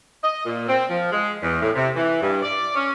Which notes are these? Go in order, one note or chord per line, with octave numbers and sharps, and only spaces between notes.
D#5
A#2
C4
F3
G#3
E2
A2
C3
E3
G2
D5
C#4